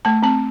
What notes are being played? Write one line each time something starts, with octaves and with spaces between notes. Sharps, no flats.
A3 A5
C4 A5